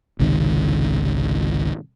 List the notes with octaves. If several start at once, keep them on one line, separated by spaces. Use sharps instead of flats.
G#1 C#2 C3 D#3